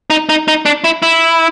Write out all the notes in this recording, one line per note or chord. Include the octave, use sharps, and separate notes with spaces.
D#4
D#4
D#4
D4
E4
E4